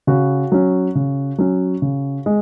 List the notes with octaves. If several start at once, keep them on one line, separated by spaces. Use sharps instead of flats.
C#3 F#4
F#3 C#4
C#3
F#3 C#4
C#3
G#3